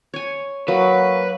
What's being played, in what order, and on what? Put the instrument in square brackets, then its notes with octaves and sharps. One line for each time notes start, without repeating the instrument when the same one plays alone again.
[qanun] C#5 G#5
[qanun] F#3 [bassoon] A#3 [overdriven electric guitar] B4